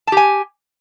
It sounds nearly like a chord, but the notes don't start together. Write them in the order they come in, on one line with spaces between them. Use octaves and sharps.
A5 G4 G#5